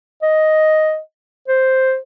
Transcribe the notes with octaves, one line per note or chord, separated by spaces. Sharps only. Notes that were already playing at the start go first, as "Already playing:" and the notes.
D#5
C5